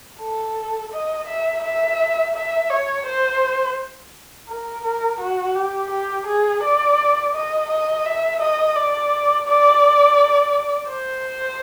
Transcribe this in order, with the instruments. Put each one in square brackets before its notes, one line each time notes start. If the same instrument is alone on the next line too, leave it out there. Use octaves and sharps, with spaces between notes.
[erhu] A4
D#5
E5
E5
E5
C#5
C5
A#4
A#4
F#4
G4
G4
G#4
D5
D#5
D#5
E5
D#5
D5
D5
C5